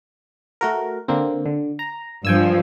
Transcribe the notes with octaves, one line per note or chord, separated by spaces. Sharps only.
A3 F#4 A#4
D3 A#3 C4
D3
A#5
G2 F3 G5 G#5 E6